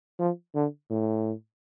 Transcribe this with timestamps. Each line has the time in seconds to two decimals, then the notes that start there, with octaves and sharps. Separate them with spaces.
0.19 F3
0.55 D3
0.90 A2